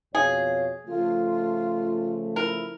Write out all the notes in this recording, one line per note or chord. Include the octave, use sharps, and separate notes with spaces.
F2 B2 G#4 C#5 F5
C#3 F3 A3 F4
E4 A#4